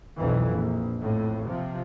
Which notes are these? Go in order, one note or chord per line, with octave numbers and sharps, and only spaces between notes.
B1 F2 E3
A#1
F2 A2
C3 F3